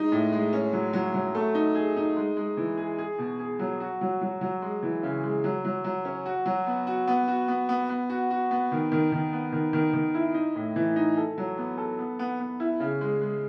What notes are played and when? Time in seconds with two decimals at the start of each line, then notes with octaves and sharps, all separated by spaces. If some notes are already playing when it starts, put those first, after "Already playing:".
Already playing: G#3 D#4
0.12 A2
0.33 G#3
0.53 C#4
0.73 F#3
0.93 F#3
1.14 F#3
1.35 A3
1.55 D#4
1.75 G#4
1.97 D#4
2.16 G#3
2.37 G#3
2.57 E3
2.77 G#4
2.98 G#4
3.18 B2
3.39 G#4
3.59 F#3
3.80 F#4
4.01 F#3
4.21 F#3
4.41 F#3
4.62 G#3
4.83 E3
5.03 C#3
5.23 G#3
5.44 F#3
5.65 F#3
5.84 F#3
6.05 C#4
6.26 F#4
6.46 F#3
6.67 B3
6.87 F#4
7.07 B3
7.28 F#4
7.48 B3
7.69 B3
7.89 B3
8.10 F#4
8.31 F#4
8.51 B3
8.72 D#3
8.92 D#3
9.12 D#3
9.33 B3
9.53 D#3
9.73 D#3
9.93 D#3
10.14 E4
10.34 D#4
10.55 A2
10.76 E3
10.96 D#4
11.17 A4
11.38 F#3
11.58 B3
11.78 A4
11.99 B3
12.19 B3
12.40 B3
12.60 E4
12.80 C#3
13.01 G#3
13.21 G#3